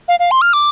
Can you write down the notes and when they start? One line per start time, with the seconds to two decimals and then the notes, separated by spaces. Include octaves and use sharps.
0.08 F5
0.20 F5
0.31 C6
0.41 F6
0.53 D6